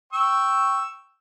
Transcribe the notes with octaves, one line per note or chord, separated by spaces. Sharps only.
G5 C#6 E6